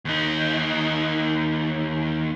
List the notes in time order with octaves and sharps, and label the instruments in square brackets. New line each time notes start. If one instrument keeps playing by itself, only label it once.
[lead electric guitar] D#2 D#4